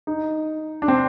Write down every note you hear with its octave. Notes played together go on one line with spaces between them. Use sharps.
D#4
D4
C4